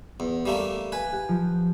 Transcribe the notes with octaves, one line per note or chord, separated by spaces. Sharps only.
E2
G3 A3 A#3
B4 G#5
G4 F#5
F3